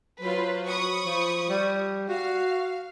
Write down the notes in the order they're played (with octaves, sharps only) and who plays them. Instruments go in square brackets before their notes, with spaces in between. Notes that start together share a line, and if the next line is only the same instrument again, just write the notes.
[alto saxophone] F#3 [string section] F4 B4 C5
[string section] B5 C#6 D#6
[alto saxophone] F3
G3
[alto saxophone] F#4 [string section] F5